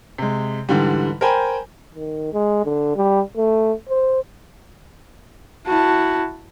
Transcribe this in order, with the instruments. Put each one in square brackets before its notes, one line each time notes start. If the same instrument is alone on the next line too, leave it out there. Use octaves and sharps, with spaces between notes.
[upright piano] C3 G#3
G#2 D3 E3 G3
A#4 C5 G5 G#5 B5
[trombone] D#3
G#3
D3
G3
A3
C5
[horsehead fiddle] E4 F#4 [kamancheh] A5